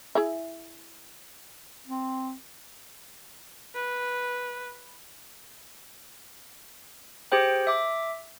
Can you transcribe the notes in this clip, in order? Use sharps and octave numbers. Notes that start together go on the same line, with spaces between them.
E4 G#4 E5
C4
B4
G4 G#4 C5 G5
E5 D6